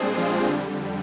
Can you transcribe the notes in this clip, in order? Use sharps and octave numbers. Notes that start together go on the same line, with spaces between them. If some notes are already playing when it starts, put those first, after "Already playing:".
Already playing: A#2 G3 G#3 C4 D4 G#4 C5
F3 F4
F2 D3 G3